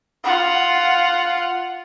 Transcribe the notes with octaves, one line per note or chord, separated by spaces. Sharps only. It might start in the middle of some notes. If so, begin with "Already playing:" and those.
F4 F#5